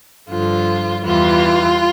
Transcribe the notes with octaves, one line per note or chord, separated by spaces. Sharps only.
G2 D3 F3 F4
E2 E3 G3 F4